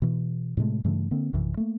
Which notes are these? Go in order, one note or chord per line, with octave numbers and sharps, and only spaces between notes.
B2 E3
A2 C3 G#3 A3
G2 C#3 E3 A3
D3 A#3 C4
A#1 F#2 C3 E3
A3 A#3